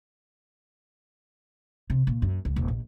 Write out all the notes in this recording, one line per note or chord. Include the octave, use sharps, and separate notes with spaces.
C3
A#2
F#2
C#2
D#1
A#1